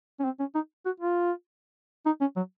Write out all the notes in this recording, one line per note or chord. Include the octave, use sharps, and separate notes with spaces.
C#4
C4
C#4
D#4
F#4
F4
D#4
C#4
F#3